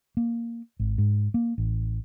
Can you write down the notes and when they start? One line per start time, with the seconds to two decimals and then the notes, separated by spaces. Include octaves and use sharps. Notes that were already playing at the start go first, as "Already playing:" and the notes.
0.17 A#3
0.79 G#1
0.98 G#2
1.34 A#3
1.58 A1